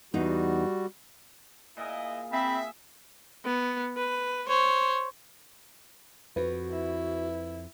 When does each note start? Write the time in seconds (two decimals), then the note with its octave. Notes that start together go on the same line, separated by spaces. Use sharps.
0.14 E2 G3 D#4 F#4
1.77 A#2 E4 G#4 D#5
2.33 C4 G#4 E5 B5
3.45 B3
3.97 B4
4.47 C5 C#5
6.36 F2 F#4 B4
6.71 E4